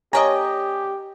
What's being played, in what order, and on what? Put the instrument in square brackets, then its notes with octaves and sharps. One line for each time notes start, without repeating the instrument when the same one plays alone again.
[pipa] D3 A#3 D#5 [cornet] G4 [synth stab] C#5 A#5 [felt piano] G#5